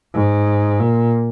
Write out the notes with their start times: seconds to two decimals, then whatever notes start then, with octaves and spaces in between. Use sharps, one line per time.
0.14 G#2
0.80 A#2